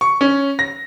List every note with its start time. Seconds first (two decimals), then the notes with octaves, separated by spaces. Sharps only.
0.01 C#6
0.21 C#4
0.59 A#6